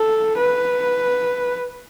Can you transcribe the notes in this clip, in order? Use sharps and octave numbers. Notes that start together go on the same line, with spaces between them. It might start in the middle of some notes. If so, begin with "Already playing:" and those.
Already playing: A4
B4